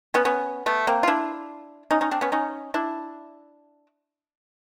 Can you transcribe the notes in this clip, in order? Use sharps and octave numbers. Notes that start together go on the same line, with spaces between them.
B3 C#4
B3 C#4
A3 B3
A#3 C4
F4
D4 E4
C#4 D#4
C#4 D#4
C4 D4
B3 C#4
C#4 D#4
D4 E4